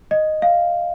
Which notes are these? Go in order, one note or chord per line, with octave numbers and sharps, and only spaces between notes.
D#5
F5